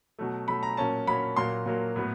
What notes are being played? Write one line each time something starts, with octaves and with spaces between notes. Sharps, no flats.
B2 F#3 A3
B2 F#3 A3 B5
A#5
A#2 F#3 A#3 C#4 A5
A#2 F#3 A#3 C#4 B5
A#2 F#3 A#3 C6
A#2 F#3 A#3
A2 F#3 B3